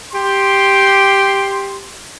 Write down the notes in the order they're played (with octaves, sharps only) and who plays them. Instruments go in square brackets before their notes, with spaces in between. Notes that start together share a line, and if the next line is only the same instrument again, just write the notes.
[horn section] G4 C6